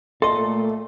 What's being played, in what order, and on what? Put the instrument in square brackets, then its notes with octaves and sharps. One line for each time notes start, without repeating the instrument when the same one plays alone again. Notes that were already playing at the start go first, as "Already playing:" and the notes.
[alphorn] A#2 [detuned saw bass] A3 [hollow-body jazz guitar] A4 D#5 [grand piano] C6